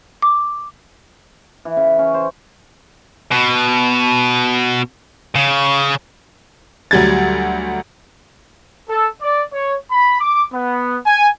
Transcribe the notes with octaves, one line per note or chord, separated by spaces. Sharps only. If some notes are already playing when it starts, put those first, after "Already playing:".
D6
E3
C#3
C#4
C5
B2
C#3
D2 F#3 G3 G#6 A6
A4
D5
C#5
B5
D6
B3
G#5